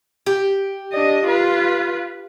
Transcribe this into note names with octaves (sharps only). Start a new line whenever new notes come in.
G4
D4 D#5
F4 B4